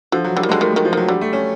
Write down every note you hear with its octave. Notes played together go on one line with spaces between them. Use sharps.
D3 F3
F#3
D3 G3
D#3
D3 G#3
D#3 A3
D#3 G#3
F3
D#3 F#3
D3 G3
A3
C#4